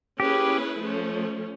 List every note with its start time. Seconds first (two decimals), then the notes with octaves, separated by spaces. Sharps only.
0.19 A#3 C#4 E4 G4 G#4 B4
0.81 F3 A3 C#4